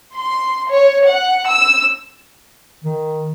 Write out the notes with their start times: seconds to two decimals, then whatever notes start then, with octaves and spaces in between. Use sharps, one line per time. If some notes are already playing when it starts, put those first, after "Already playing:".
0.14 C6
0.72 C#5
1.07 F#5
1.48 E6
2.84 D#3